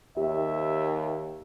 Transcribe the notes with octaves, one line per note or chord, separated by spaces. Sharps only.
D#2 G4 E5